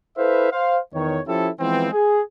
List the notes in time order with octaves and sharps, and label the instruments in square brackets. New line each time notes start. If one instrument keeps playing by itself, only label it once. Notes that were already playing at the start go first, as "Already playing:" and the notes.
[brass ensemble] E4 A4 B4 C5 E5 F5
C5 F5
E2 D#3 C#5
F3 C#4 E4 G4 A4
E3 F3 G#3 B3 C4
G#4